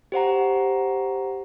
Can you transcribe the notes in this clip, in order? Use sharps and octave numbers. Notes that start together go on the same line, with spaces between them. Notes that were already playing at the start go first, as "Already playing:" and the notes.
G4 C5 F#5 A#5